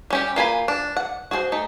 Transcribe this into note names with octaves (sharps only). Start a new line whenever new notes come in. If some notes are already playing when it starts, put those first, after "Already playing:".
G3 C#4 G4
A#3 F4 G#5 B5
D4
F#5
F#4 G#4 A4 C5
A3 D#4